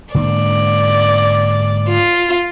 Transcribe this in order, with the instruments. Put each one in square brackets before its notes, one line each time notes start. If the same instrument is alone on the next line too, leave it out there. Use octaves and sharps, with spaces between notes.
[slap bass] G#2 D3 A#3 [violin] D5
[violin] F4